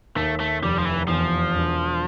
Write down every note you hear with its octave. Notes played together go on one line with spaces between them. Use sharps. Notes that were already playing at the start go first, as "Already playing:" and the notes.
D#2 A3
A3
F1 G3
F3
E3
E2 F3
E1